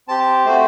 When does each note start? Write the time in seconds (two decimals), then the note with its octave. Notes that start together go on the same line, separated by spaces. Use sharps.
0.08 C4 G4 A5
0.46 A3 C4 F#4 C5